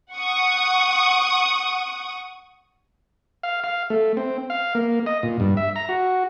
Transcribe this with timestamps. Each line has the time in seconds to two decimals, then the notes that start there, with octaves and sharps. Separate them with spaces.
0.13 F#5 C#6 D#6
3.43 F5
3.64 F5
3.90 A3
4.17 C4
4.50 F5
4.75 A#3
5.06 D#5
5.23 A#2
5.40 G2
5.57 E5
5.76 A#5
5.89 F#4